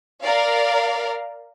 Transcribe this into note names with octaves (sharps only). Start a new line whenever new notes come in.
A#4 D5 F5